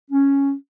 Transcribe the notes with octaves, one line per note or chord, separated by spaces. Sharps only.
C#4